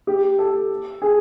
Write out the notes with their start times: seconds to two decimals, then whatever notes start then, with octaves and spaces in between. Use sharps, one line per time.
0.07 G4
0.39 A4
1.02 G#4